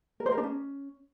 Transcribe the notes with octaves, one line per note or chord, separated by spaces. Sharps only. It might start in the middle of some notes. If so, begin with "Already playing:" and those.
A#4
C5
A#4
D4
C#4